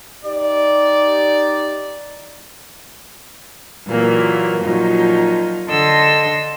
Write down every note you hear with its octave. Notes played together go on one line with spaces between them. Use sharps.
D#4 G4 D5
A#2 E3 F#3 A#3
A#2 F3 F#3 D#4
D3 A4 D#5 C6 E6 A#6